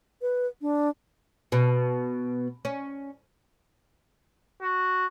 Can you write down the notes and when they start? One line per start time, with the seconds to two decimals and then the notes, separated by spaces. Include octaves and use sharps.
0.22 B4
0.62 D4
1.52 B2
2.65 C#4
4.62 F#4